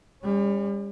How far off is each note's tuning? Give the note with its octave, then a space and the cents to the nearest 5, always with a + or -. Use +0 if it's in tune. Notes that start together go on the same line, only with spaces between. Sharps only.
G3 +35 C#4 +0